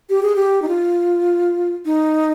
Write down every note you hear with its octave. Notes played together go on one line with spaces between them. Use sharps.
G4
G#4
G4
D#4
F4
D#4